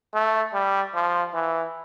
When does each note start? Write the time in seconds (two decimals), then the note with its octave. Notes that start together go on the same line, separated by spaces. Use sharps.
0.14 A3
0.54 G3
0.95 F3
1.34 E3